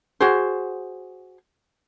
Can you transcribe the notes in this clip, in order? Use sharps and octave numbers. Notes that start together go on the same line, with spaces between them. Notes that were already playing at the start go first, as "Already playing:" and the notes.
F#4 G#4 C5